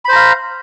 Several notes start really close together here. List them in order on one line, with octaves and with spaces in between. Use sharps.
B5 C5 A#5 F5